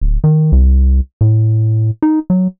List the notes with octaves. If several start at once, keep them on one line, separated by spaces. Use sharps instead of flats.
D1
D#3
C2
A2
D#4
F#3